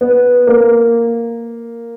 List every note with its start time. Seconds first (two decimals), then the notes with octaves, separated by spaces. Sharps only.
0.01 B3
0.47 A#3